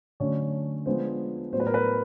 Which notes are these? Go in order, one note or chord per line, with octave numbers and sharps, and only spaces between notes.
D3 F#3 A3 C#4 C#5
F3 G#3 B3 D4 C5
A2 F#3 B3 C5
B4
A#4
B4